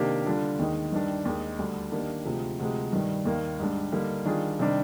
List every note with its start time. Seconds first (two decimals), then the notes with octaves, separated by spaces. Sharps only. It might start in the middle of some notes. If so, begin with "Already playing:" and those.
Already playing: C3 D#3 A#3 D4 G4
0.26 D3 G3 D4 F4
0.59 D#2 D#3 G#3 D#4
0.92 G2 D#3 G3 D4
1.25 D#2 D#3 G#3 D#4
1.58 D2 D3 G3
1.92 D#3 A#3 D4 G4
2.25 D2 C3 F3 G#3
2.59 D2 C3 F3 G#3
2.93 G2 D#3 G3
3.25 D#2 D#3 A#3
3.59 G#2 G3 D4
3.92 D3 G3 A#3 D#4
4.25 D#3 G3 D4 F4 G#4
4.59 C3 D#3 G3 D4